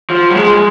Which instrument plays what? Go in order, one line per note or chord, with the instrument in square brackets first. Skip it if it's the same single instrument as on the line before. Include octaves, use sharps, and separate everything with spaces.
[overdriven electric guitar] F3
F#3
G#3